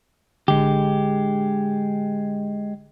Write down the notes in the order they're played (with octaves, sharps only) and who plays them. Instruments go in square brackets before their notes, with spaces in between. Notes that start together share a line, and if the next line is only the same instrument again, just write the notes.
[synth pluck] A1 D3 [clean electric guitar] G#3 G4